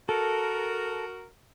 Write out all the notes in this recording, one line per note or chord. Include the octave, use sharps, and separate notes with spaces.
F#4 A4 A#4